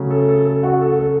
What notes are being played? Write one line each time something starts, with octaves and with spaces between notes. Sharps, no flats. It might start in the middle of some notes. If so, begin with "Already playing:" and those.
Already playing: C#3 F#3 A3
A4
A4
A4
F#4
A4
A4